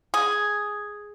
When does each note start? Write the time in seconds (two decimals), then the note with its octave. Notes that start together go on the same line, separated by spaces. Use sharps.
0.14 G#4